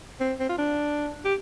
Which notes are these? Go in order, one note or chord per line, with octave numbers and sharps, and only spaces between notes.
C4
C4
F4
D4
G4